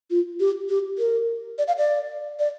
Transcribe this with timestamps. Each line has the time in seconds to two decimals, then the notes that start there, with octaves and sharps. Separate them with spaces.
0.11 F4
0.40 G4
0.69 G4
0.98 A#4
1.58 D5
1.68 F5
1.78 D5
2.39 D5